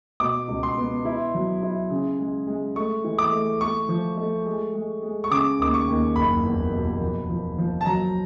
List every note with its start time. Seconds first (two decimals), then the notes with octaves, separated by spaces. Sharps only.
0.20 B2 D6
0.48 C#2
0.63 C6
0.78 B3
1.05 E4
1.34 F#3
1.63 E4
1.90 C#3
2.19 G#3
2.47 G#3
2.76 A3 C#6
3.04 E3
3.18 D6
3.32 A3
3.61 A3 C#6
3.89 F3
4.17 A3
4.45 G#3
4.74 G#3
5.02 G#3
5.24 C#6
5.31 C#3 D6
5.59 D#2 D6
5.74 C#6
5.88 D#2
6.16 F#1 B5
6.45 E2
6.73 B2
7.01 F3
7.29 F3
7.58 F3
7.81 A5
7.86 F#3 A#5